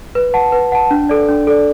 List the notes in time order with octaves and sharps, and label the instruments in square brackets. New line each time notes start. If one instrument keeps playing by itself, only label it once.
[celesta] B4
F#5 A5
B4
F#5 A5
D4
A4 D5
D4
A4 D5